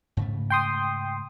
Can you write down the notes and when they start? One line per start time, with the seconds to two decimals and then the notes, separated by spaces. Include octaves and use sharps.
0.17 G#2 C#3 A3
0.50 G5 C6 D#6